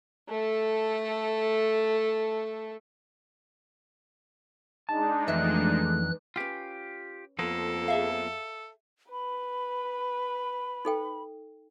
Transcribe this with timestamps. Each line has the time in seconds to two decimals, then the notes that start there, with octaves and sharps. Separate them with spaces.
0.28 A3 A4
4.89 G#3 D4 D#4 A5
5.28 F2 E3 A3 E5 F#6
6.36 C#4 F4 G4 B4 G#5
7.39 F2 F3 A#3 B3 A4
7.88 G#4 E5 F5
9.12 B4 B5
10.85 D#4 A4 G5